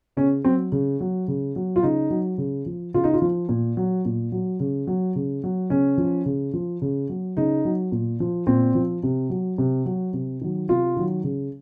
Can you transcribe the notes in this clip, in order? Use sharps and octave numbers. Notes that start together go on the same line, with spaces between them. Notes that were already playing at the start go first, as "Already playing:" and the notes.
C#3 C#4
F#3 C4
C#3
F#3
C#3
F#3
F4
C#3 D#4
F#3
C#3
F3
C#3 F4
D#4
F4
F3
A#2
F#3
A#2
F#3
C#3
F#3
C#3
F#3
C#3 C#4
F3
C#3
F3
C#3
F#3
C#3 D#4
F#3
A#2
F3
A#2 C4
F3
C3
F#3
C3
F#3
C3
D#3 F#3
C3 F4
D#3 F#3
C#3